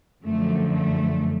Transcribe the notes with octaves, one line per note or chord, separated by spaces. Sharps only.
F#2 D3 F3 A3
A3